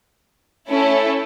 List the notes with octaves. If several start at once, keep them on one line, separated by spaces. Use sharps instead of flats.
A3 C#4 E4 A4